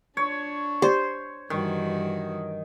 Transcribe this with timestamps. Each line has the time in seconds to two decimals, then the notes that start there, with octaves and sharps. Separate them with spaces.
0.17 D4 C#5
0.82 G4 C5 D5
1.50 G2 D#3 E3 F#4